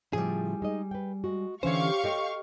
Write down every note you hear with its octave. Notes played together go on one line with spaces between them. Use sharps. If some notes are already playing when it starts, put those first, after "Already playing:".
A2 C#3 F3 G3 G#4
G#3 D#4 D#5
B4 G5
G#3 F#4
D3 E3 C#4 G4 C5 C#5 F5 C#6
A4 D#5 G5